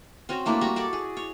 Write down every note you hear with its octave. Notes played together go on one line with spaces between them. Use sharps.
C4 C#4 F#4
A3 A#3 D4 E4
G3 F#4 A#5 C#6
F#4 A4 D5
G#4
C#5